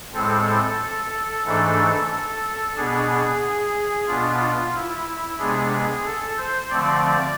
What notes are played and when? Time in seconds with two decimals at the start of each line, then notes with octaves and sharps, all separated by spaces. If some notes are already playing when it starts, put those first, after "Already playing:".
0.13 A2 G#3 C4 A4
1.45 G#2 E3 A3 D4
2.10 A4
2.76 B2 B3 D4 G#4
4.07 B2 B3 D4 F4
4.74 E4
5.38 C3 G#3 B3 D4 G#4
6.05 A4
6.37 C5
6.70 D3 F3 A3 C4 D5